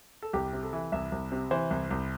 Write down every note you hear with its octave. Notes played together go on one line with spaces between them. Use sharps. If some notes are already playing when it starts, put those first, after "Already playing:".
A4
C2 G4
C3
A4
E3
C2 E5
C2
C3
E3 C5
C2
C2